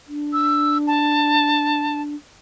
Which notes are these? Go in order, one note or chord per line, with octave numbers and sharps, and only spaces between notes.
D4
E6
A5